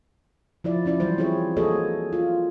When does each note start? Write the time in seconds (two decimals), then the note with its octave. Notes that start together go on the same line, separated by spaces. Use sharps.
0.64 F3 E4 D5
0.85 F3 C#4 E4 D5
1.00 E3 F#3 G3 C4 C5
1.18 C4 E4 F4 G#4 C#5
1.57 A#3 F#4 G#4 A4 C#5 D#5
2.13 F4